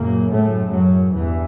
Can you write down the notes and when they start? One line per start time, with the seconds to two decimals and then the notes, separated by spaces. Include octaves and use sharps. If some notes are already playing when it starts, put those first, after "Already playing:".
Already playing: F#2 A#2 C#3 A#3
0.30 A2 A3
0.72 F#2 F#3
1.14 E2 G2 E3